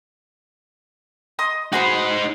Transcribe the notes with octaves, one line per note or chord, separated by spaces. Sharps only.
D#5 C6 D#6
D#4 F#4 G#4 B4 C5